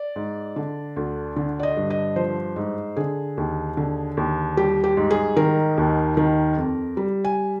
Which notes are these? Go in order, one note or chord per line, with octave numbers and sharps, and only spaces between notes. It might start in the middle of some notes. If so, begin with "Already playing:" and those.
Already playing: D5
G#2
D3
D2
D3
D5
D#5
G2
D#5
F3 C5
G#2
D3 G#4
D#2
D3
D#2
G3 G4
G4
G#2
G#4
D#3 A#4
D#2
D#3
F2
G3
G#5